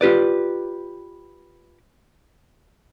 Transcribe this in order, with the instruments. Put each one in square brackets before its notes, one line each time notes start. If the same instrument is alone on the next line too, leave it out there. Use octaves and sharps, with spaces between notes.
[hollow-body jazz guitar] F4 G4 B4 D5